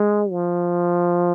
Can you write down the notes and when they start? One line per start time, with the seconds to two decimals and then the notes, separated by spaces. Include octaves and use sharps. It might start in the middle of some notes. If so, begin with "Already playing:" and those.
Already playing: G#3
0.31 F3